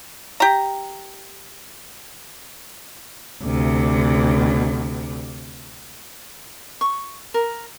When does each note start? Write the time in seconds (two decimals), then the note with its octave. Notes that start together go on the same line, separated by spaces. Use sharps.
0.40 G4 A#5
3.43 D2 C3
6.81 C#6
7.34 A#4